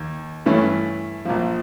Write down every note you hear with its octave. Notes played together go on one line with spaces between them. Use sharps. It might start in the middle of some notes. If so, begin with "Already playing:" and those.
Already playing: D#2
G2 E3 A3 C#4 E4
A#1 A#2 F3